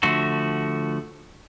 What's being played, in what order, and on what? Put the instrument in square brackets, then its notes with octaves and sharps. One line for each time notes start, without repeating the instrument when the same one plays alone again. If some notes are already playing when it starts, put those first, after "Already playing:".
[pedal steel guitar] D3 F3 A3 F#4